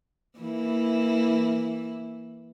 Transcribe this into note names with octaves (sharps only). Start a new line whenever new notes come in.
E3 A#3 E4